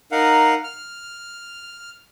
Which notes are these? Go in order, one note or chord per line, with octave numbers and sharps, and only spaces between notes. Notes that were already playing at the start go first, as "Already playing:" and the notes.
D#4 A#4 F5 F#5
F6